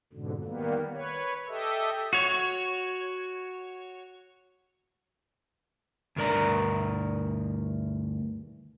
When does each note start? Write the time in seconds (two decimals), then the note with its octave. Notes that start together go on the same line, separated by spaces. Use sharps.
0.13 F2 G#2 B2 D3
0.44 D#3 G3 A#3 B3
0.93 B4 C#5
1.48 G4 A4 D#5 E5
2.13 F#4 C#5
6.16 D2 G2 A#4 D5 A#5